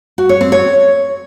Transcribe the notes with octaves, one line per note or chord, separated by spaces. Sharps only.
F#4
C#5
C4
C#5